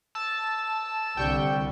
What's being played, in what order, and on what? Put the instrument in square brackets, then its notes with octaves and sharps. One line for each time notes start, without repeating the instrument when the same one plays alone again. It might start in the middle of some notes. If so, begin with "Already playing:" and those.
[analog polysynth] A5 [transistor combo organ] E6
[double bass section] C2 D3 [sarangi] G3 [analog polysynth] G5 C#6 G6